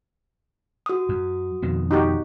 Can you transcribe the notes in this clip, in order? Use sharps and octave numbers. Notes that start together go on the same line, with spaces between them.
F#4 D#6
F#2
F2 B2 D#3
D#4 F#4 G4